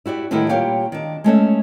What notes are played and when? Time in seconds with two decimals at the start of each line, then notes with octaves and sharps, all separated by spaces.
0.06 E4 F#4 G4 D5
0.31 A2 D3 D#3 G3 B3 E4
0.49 A#2 G3 G4 C#5 F5 G5
0.92 D#3 D4
1.24 G#3 A3 C#4 E5